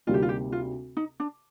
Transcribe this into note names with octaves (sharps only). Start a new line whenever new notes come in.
D2 C3 G3 A#3 D#4 F4
G4
F4
G4
F4
D#4
D4